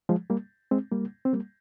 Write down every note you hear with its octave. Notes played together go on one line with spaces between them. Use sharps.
F3 G#3
G3 A#3
G#3 C4
G3 A#3
C4
G3 A#3